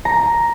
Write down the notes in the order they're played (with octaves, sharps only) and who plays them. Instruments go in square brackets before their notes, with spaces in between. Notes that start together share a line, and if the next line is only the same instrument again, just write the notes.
[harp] A#5